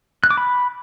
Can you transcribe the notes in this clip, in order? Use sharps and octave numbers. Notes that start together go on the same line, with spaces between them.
F#6
D6
B5